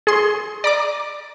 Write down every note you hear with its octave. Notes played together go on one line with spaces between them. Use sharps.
G#4 C6
D5 A#5 D6